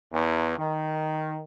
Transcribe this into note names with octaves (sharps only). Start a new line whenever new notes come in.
E2
D#3